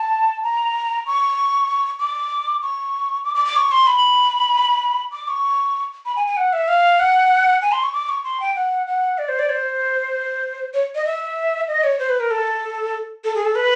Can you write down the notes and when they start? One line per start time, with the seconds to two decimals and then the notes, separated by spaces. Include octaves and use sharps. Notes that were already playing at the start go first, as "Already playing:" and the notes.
Already playing: A5
0.44 A#5
1.06 C#6
1.99 D6
2.62 C#6
3.25 D6
3.35 D6
3.45 D6
3.56 C#6
3.72 C6
3.87 B5
5.12 D6
5.28 C#6
6.06 B5
6.16 G#5
6.27 G#5
6.37 F#5
6.53 E5
6.68 F5
6.99 F#5
7.62 G#5
7.72 C6
7.83 C#6
7.93 D6
8.09 C#6
8.24 C6
8.40 G5
8.56 F#5
8.87 F#5
9.18 D5
9.29 C5
9.39 D5
9.49 C5
10.74 C#5
10.95 D#5
11.06 E5
11.68 D#5
11.84 C#5
11.99 C5
12.09 B4
12.20 A#4
12.31 A4
13.24 A4
13.35 G#4
13.45 A4
13.55 B4